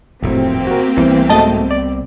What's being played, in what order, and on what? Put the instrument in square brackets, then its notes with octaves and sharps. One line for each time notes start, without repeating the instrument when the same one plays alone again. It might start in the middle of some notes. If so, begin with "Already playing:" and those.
[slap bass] F1 D#2 [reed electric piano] A2 F#3 [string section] A#3 C4 G4
[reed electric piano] F#4 A#4
[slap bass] C2 B3 [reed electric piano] E3
[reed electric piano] G#2 F#3 A3 [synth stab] D#5 A5
[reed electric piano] D5